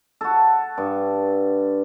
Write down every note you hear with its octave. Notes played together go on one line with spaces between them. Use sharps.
F#4 A4
G2